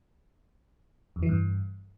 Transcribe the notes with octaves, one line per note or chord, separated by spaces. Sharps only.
F2
E3
G2